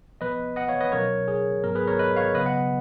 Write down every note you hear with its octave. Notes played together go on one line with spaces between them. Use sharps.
A#2 F3 B3 B4 D#5
D#5 F#5
C#5 F5
B4 D#5
B2 F#3 C#4 A#4 C#5
G#4
G#2 F#3 B3 A#4
G#4 B4
A#4 C#5
B4 D#5
C#5 F5
C#3 F#3 B3 B4 D#5
D#5 F#5